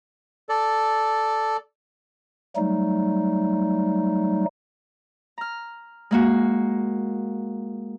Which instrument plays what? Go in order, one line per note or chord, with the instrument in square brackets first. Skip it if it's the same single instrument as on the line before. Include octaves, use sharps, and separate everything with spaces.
[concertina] A4 D5
[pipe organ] F#3 G3 A3 D#4
[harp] A#5 F6
G#3 A#3 F#4